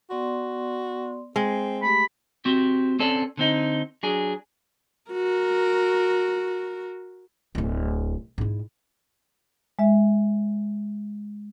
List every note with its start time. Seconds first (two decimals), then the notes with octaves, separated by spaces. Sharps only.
0.10 B3 F#4 D5 C6
1.36 G#3 C4
1.82 A3 G4 B5
2.45 C4 F#4 G4
2.99 C4 C#4 A4 D5
3.37 D3 C4 D#4
4.03 F#3 D4 G#4
5.11 F#4 A#4
7.55 D1 E4
8.38 G#2 E4
9.79 G#3 E5